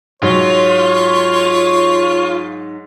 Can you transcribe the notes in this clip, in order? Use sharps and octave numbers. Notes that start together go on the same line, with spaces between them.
G#2 F#3 F4 C#5